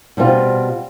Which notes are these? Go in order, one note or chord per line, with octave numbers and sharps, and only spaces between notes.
B2 G3 C4 F4